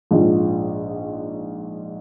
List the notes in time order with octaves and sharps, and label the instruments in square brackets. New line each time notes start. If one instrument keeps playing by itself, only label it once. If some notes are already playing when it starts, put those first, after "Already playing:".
[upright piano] A#1 G#2 F3